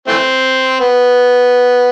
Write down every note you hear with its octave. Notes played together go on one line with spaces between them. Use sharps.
E3 A3 C4
B3